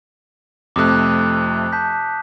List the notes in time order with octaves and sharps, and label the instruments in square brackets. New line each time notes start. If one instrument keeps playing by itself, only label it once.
[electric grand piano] F2 C3 A3 [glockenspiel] D6 D#6 F#6
[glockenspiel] A5 G6 B6